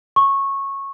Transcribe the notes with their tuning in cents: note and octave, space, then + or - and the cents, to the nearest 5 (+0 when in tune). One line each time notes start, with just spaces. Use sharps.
C#6 -15